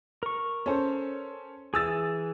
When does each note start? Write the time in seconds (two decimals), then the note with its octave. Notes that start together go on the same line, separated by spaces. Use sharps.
0.23 A#4 C#6
0.66 C#4 A4 C5
1.74 E3 G#4 D#6 E6 A6